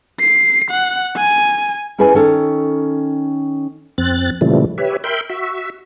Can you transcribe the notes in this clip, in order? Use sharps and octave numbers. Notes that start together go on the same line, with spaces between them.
C7
F#5
G#5
C#4 E4 G#4 B4 D#5 G#5
D#3 C#4 A4
F2 C4 F#6 A6
A#2 C#3 E3 F3 G3 A3
G4 B4 C#5 E5
A#4 E5 G5 B5 C6
F#4 E5